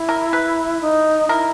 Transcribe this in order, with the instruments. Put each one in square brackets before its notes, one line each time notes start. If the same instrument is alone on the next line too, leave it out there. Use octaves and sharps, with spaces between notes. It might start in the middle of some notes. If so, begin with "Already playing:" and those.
Already playing: [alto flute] E4
[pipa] A#4
B4
[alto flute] D#4
[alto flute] E4 [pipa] A#4